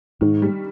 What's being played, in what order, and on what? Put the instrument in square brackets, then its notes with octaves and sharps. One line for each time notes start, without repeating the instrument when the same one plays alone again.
[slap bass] G#2 [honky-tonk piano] D#3
[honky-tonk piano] G3